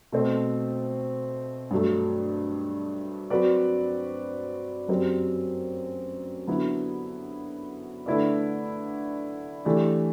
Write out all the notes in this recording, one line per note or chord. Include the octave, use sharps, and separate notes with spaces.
B2 A3 C4
G2 F#3 A3
F#3 C4 F#4 B4 D5
F#2 F#3 C4 G4
D3 F#3 B3 E4
D3 A3 E4 B4 D5
E3 A3 D4 G4